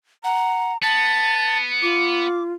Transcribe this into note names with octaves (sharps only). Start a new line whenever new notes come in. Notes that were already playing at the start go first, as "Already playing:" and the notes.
F#5 A#5
B3 A5 A6
F4 D6